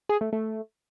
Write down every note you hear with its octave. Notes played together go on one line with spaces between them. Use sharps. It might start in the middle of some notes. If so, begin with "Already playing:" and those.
G#4
A3
A3